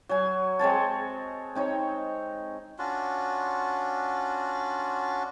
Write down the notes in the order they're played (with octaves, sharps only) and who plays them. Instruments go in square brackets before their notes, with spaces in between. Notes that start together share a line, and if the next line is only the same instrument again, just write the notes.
[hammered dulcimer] F#3 G#5
G#3 C4 C#5 A5
C4 D#4 C#5
[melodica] C#4 D4 F4 F#4